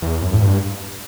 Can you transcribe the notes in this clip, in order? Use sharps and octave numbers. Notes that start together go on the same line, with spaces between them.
E2
F#2
A2
G2